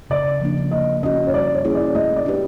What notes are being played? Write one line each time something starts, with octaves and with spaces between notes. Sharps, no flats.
C#3 D5
F3 A#3 D4
A#3 D#5
C#4 F#4 D#5
C#5
G3 D5
C#5
A#3 C#4 E4 G#4
D5
A3 D#5
D5
D4 G4 B4